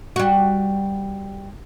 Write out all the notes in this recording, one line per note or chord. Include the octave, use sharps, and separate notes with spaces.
G3 F#4